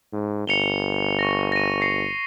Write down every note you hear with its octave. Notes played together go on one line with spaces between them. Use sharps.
G#2
G1 C#7 F7 G7
C#6 A#6
A#6 D#7
A#6 C7 C#7